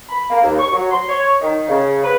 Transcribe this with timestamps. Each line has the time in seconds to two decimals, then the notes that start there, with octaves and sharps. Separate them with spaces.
0.09 B5
0.30 A#3
0.43 D#2
0.59 C#6
0.72 F#3
0.92 C6
1.09 C#5
1.41 D#3
1.68 C#3
2.04 B4